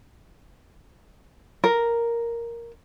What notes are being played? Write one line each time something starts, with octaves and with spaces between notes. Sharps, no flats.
A#4